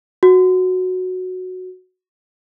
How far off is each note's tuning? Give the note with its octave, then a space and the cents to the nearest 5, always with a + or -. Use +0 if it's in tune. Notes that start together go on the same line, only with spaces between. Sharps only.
F#4 -5